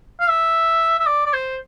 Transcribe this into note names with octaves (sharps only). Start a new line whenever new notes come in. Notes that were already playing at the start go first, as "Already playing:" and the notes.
F5
E5
E5
D5
D5
C5